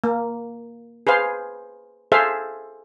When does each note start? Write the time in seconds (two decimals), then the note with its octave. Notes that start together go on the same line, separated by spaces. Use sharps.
0.04 A#3
1.07 G#4 B4 C5 F5
2.12 G#4 A4 C5 E5 F5